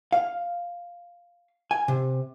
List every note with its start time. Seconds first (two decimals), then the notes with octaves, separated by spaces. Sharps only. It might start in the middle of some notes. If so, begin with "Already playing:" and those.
0.12 F5
1.71 G#5
1.88 C3